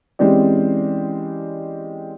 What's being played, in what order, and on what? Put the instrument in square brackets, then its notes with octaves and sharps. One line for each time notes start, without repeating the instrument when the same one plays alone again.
[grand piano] E3 G#3 C4 C#4 G4 D5